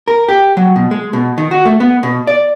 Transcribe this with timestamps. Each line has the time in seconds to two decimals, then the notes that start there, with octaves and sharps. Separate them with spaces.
0.08 A#4
0.29 G4
0.57 F#3
0.76 B2
0.91 G#3
1.13 B2
1.38 D#3
1.51 F#4
1.65 A3
1.80 B3
2.03 B2
2.27 D5